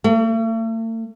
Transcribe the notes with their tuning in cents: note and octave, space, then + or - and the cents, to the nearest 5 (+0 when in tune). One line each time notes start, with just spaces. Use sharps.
A3 +45